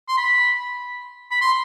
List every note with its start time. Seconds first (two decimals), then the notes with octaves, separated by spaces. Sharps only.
0.08 C6
0.17 B5
1.31 B5
1.41 C6